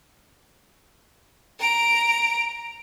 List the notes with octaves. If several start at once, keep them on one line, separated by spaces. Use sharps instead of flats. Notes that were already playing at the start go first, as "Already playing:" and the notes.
A#5 D7